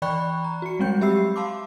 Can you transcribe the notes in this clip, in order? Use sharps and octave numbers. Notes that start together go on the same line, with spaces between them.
E3 D5 G5 B5 C#6 F#6
A#5
F#4 C#7
G3 G#3 C4 G5 G6
F#3 G4 E5 B5 E6 C7
F5 A5 C6 D6